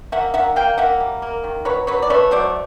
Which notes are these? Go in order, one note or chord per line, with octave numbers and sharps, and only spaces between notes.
A#3 E5 F#5
D#3 E5 F#5
A#3 F5 G5
A#3 E5 F#5
G3
A#3
D#3
F#3 B4 C#5
F#3 B4 C#5
D5
A3 B4 C#5
F#3 C5 D5